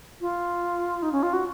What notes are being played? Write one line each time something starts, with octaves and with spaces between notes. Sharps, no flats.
F4
D#4
C#4
F4
F#4